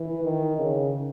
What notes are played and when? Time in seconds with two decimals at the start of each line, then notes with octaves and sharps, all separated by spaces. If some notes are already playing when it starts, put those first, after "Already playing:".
Already playing: E3
0.24 D#3
0.57 C#3